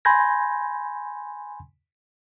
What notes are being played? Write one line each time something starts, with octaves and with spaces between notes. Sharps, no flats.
G#5 B5 C6 G6 G#6 A#6